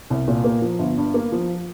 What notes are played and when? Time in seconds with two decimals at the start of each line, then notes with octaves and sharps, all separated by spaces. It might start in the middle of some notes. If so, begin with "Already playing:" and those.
0.10 C2
0.28 A#2
0.44 A#3
0.62 F3
0.79 G1
0.97 G2
1.14 A#3
1.32 F3